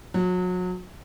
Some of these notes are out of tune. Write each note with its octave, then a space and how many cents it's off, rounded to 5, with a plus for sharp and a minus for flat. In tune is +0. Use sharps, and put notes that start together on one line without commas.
F#3 -30